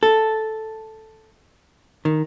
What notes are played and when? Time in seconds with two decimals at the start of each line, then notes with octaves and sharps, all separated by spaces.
0.03 A4
2.05 D#3